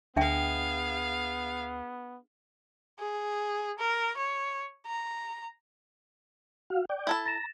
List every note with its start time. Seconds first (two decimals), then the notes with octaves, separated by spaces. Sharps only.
0.16 D2 B3 D4 G#4 E5 F5 G5
2.99 G#4
3.79 A#4
4.17 C#5
4.86 A#5
6.70 F#4 F5
6.89 D5 G5
7.07 E4 A4 A5 B5 G#6
7.26 A#5 A6 A#6 E7